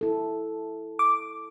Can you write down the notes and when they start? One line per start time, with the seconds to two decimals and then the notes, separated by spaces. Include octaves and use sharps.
0.01 E4 A4
0.99 D6